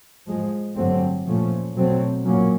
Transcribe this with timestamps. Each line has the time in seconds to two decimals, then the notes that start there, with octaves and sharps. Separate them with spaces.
0.26 A2 F3 G#3
0.75 G2 D3 F#3 A3 C4
1.26 A#2 F3 A3 C#4
1.75 B2 F#3 A3 C4
2.25 A#2 F#3 A#3 C#4